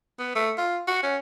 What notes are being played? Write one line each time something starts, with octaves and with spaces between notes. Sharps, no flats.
B3
A3
F4
F#4
C#4